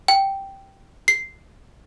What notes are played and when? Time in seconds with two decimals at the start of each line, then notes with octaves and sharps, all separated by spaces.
0.08 G5
1.08 C7